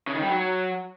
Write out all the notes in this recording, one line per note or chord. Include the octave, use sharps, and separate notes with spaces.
C#3
D#3
G3
F#3